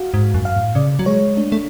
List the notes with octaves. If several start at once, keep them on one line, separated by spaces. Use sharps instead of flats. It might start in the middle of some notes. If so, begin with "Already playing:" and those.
Already playing: F#4 F5
G#2
F#2
F5
A2
C#3 D5
F#3
G#3 C#5
A3 D4
A3